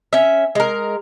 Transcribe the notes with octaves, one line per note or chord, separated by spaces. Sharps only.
C#4 E5
G#3 A#4